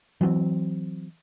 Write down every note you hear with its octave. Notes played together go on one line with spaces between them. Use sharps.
E3 F#3 G#3 C4